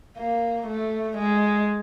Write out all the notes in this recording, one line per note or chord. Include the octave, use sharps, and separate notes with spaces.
A#3
A3
G#3